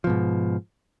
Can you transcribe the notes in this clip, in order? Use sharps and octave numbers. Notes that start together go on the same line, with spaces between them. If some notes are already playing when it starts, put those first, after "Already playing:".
G#2 B2 F3